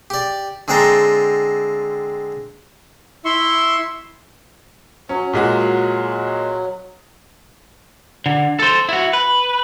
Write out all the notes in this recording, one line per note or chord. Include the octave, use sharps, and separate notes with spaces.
G4 D5
D3 G#3 C4 G5 A5 A#5
E4 E5 C6 C#6
F#3 C#4
A#2 G#3 F#4
D3
A4 C5
E4 F#4
B4